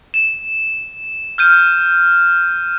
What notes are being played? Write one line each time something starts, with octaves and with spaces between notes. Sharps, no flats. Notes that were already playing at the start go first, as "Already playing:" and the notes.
E7
F6 G6 D#7